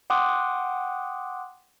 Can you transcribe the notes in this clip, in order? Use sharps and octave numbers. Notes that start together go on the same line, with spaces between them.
F#5 G5 C6 D6 D#6 F#6